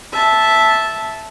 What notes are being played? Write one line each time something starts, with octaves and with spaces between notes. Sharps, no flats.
E5 A5